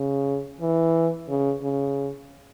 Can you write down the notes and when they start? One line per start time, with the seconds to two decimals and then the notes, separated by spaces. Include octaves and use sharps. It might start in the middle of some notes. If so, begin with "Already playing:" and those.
Already playing: C#3
0.61 E3
1.29 C#3
1.63 C#3